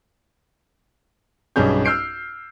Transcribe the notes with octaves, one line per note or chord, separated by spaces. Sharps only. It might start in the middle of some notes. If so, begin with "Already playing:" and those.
B1 G2 G3 C#4 G#4 G6
E6 F6 G6 C7 D7